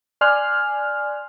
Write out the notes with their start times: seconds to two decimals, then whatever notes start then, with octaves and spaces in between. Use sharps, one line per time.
0.21 D5 G#5 C6 F6 F#6